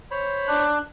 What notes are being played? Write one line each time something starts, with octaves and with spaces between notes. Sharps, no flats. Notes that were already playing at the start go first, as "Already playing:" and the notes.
C5 C#5 B5
D4 F#6